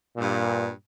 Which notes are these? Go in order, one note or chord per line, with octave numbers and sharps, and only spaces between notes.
G2 A#2